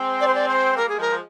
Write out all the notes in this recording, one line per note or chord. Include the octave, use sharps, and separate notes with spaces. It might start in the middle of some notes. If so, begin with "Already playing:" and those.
Already playing: G#3 C4
D5
C5
D5
C5
C4
G3 A#3 A#4
A#3 G#4
F3 G#3 A#4
F3